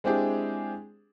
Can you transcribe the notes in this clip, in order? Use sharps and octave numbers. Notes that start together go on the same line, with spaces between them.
G#3 C4 D4 E4 G4 G#4